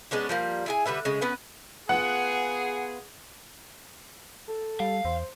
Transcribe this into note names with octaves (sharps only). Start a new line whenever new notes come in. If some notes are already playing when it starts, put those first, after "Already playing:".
G#3 B3 C#4 D4
F3 G3 A#3
E4 G#4 G#5
D3 G3 B4 E5
C#3 G#3
B3 C#4 B4 F#5
B3 F4 G#4 F#5
A4
G3 F5
E2 C5